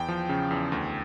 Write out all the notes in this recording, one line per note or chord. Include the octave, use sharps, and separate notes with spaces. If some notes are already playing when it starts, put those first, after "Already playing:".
Already playing: E2 G5
F3
C#3
E2
D2